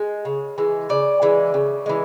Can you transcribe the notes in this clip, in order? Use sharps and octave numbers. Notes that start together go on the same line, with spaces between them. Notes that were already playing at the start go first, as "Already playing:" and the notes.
Already playing: G#3
C#3
E3 G#3
C#3 D5
E3 G#3
C#3
E3 G#3